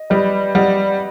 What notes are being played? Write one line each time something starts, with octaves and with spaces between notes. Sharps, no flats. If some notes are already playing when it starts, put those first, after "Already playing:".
Already playing: D#5
G3 B4 D#5
G3 D#5 F#5